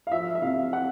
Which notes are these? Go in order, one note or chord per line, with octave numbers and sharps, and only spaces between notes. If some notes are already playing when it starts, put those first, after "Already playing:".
F5
F3 E5
E5
C3 F5
F#5